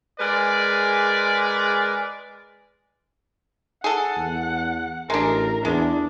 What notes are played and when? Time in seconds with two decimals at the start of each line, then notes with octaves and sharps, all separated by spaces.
0.19 G#3 G#4 A#4 B4 D5
3.84 G#4 A4 F#5
4.17 E2
5.10 A1 G#3 D4 A#4
5.65 E2 G#3 D4